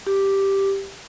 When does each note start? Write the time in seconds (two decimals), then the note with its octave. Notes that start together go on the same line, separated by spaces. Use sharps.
0.07 G4